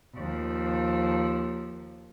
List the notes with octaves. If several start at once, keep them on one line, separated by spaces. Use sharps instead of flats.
D#2 F3